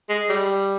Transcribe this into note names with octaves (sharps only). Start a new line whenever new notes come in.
G#3
G3